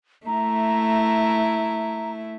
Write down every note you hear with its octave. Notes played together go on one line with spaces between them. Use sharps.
A3 E4 A#5